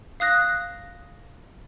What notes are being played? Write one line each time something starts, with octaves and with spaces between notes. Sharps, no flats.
F5 D#6 F#6 A#6